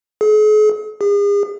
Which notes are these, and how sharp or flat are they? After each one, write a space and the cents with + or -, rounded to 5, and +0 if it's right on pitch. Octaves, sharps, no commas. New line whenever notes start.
G#4 +45
G#4 -40